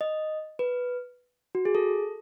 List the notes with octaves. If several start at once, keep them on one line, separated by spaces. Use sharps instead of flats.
D#5
B4
F#4
G#4
A4